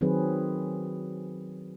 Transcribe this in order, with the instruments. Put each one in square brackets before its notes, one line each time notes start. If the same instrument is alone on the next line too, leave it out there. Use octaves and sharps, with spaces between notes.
[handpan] D#3 F#3 C4 G#4 B4